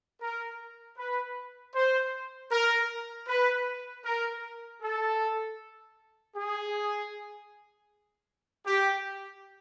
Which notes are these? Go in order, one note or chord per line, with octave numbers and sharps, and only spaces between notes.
A#4
B4
C5
A#4
B4
A#4
A4
G#4
G4